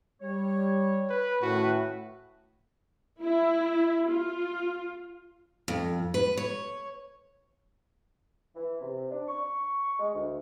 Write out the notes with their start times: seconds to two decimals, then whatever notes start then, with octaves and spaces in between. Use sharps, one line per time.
0.21 G3 C#5
1.10 B4
1.42 A2 D#3 C#4 F#4 B4
3.22 E4
4.10 F4
5.68 F2
6.14 B4
6.37 C#5
8.56 E3
8.81 C3
9.11 D4
9.28 C#6
9.99 G#3
10.14 D2